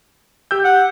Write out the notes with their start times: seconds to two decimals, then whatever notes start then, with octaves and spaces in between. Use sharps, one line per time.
0.51 G4 E6 G6
0.64 F#5